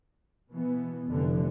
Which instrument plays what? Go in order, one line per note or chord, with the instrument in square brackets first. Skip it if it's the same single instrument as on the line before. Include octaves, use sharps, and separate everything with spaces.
[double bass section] B2 E3 B3
F1 D3 E3